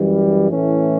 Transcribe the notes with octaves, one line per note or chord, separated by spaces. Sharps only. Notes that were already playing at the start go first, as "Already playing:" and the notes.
Already playing: F#2 E3 G3
A2 E3 A3 C#4